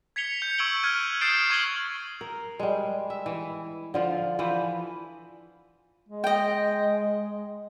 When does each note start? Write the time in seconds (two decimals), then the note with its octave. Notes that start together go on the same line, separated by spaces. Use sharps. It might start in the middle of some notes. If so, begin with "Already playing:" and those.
0.16 G#6 B6 C#7 F7 G7
0.42 G6 C#7
0.58 C#6 E6 G#6 D7 F#7 G7
0.83 F6 F#6 G#6 D#7
1.21 D#6 G6 A6 C7 D7 E7
1.50 C#6 G#6 D#7 F#7 G7
2.21 A#4
2.59 G3 G#3
3.10 E5
3.26 E3
3.94 D3 F3 F4
4.39 E3 F3 B4 C5
6.09 G#3
6.24 D#5 G5